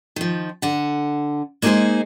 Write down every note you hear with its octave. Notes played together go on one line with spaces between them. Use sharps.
D#3 F3
D3 F#5
G#3 A#3 D#4 F#4 G#4 C5